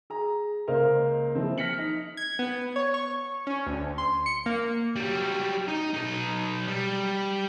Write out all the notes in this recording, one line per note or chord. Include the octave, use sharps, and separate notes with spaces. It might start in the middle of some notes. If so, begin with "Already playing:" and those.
G#4 A#5
C#2 A#3 A#4 C5 D#5 F5
E3 F3 C4
F6 A#6 B6 C#7 F#7
D#4
G#6
B3
C#5
C#6
C#4
D2
C6
C#7
A#3
F#3 G3
D#4
B1 D#4
G3